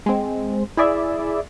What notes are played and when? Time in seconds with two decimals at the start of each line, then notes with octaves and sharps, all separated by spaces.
0.06 G#3 C4
0.77 E4 G#4 D5 E5